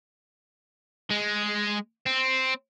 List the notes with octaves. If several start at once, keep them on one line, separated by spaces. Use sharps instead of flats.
G#3
C4